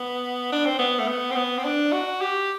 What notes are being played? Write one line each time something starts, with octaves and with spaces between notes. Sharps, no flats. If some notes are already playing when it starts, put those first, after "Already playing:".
Already playing: B3
D4
C4
B3
A3
B3
C4
B3
C4
D4
F#4
G4